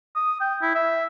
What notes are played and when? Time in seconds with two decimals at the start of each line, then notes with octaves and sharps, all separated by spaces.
0.15 D#6
0.41 G5
0.62 E4
0.75 E5